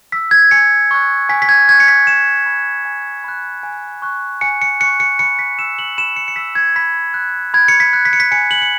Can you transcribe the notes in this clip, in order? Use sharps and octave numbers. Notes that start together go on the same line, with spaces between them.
E6 B6
G#6
G#5 C#7
C#6 F#6
G#5 B6
B6
G#6
C#6 F#6 G#6
C#7
B6
G#5 E7
B5 F#6
G#5
B5 F#6
G#5
C#6 F#6
G#5 C#7
C#7
C#6 F#6 C#7
C#7
B5 C#7
B6
E6 E7
F#7
B5 E7
C#7
C#7
E6 B6
G#6
B5 B6
F#6
B5 G#6
C#7
B6
F#6
B6
C#7
B6
G#5 C#7
F#7
C#7